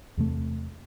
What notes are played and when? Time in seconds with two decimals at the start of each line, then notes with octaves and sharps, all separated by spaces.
0.17 E2 C3 A3